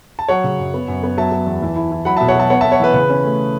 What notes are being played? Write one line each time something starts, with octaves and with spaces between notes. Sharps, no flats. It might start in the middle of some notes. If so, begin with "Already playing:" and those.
A5
F#3 C#5 F#5
C#3
F#2
B3
F#2
B3
F#3 E5 A5
F#3
E2
E3
E4
E4
F#3 F#5 B5
E5 A5
B2
C#5 F#5
F#3 E5 A5
B3 C#5 F#5
E5 A5
B3
C#5 F#5
E3 B4 E5
C#3 B4
C#4
A3